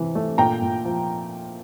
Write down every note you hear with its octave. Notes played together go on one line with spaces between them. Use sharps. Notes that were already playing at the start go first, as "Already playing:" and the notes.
Already playing: C3 E3
A3
A#2 G5 A#5
A#2
F3